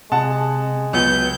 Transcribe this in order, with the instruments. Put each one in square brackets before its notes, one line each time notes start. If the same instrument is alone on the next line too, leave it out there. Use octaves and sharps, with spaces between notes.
[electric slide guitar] C3 [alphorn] G#3 [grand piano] F#5 A5
[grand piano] C#2 [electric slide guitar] F#3 B3 [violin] G6